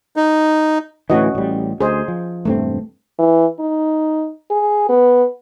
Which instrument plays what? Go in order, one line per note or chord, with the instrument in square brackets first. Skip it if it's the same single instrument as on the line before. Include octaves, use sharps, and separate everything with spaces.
[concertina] D#4
[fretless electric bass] D2 A2 E3 [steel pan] C#4 F#4 D#5
[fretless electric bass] A1 G3
[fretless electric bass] D2 [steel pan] G#4 C5 D#5
[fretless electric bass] F3
[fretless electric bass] E1 G2 C4 [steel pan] A3
[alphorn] E3
D#4
G#4
B3